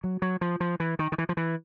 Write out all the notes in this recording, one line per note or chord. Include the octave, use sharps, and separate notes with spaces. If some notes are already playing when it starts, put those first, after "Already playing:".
F#3
F#3
F3
F3
E3
D#3
D#3
E3
F3
E3